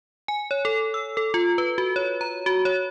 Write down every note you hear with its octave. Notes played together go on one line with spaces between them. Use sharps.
G#5
C#5
A4
E6
A4
F4
B4
F#4
C#5
A#5
F#4
C#5